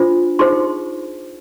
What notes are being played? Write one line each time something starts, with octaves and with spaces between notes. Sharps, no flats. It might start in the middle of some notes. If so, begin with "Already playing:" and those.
Already playing: D4 F4 C5
D#4 G#4 C5 C6